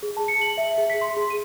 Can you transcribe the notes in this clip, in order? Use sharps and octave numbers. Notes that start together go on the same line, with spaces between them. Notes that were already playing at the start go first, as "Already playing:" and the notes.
G#4
A5
C#7
F#7
E5
G#4
B6
C6
G#4
D#7